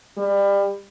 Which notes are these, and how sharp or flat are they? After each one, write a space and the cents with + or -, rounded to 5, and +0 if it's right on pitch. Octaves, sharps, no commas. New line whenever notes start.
G3 +25